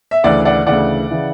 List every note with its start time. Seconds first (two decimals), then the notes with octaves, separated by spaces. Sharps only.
0.11 E5
0.24 D2 C#3 E3 D5 F#5
0.45 D5 F#5
0.66 D2 C#3 E3 D5 F#5
1.10 C#3 E3